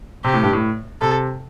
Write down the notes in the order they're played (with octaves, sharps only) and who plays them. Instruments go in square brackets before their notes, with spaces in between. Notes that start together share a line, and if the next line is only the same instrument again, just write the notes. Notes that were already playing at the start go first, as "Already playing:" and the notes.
[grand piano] C3 [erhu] G4
[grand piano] A2
G2
A2
[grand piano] C3 [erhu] A4